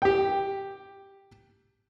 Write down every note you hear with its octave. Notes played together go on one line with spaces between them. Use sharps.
G4 G5